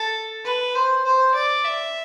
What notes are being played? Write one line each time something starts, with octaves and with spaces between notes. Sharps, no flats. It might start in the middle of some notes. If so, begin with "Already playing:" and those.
Already playing: A4
B4
C5
C5
D5
E5